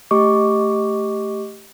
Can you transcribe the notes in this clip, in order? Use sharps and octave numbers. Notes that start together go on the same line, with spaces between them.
A3 G4 D#5 C#6 D6